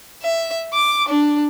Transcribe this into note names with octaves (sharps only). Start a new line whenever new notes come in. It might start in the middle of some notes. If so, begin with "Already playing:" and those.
E5
D6
D4